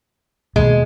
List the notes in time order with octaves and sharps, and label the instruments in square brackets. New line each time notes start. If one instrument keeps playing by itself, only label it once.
[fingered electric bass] D#2 B2 [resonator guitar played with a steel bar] G#3